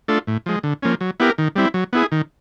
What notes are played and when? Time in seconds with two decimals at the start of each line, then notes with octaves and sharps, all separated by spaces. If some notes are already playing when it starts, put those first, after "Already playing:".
0.08 A3 D4 F4 A4
0.27 A2
0.46 F3 G#3
0.64 D3
0.83 F3 A#3 C#4
1.01 F#3
1.20 B3 E4 G4 A#4
1.38 D#3
1.56 G3 C4 E4
1.74 F#3
1.93 B3 E4 G#4
2.12 D#3